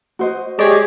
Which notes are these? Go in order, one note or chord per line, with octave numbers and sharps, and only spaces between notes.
F#4 C5 D#5
G#3 G4 G#4 C#5 D5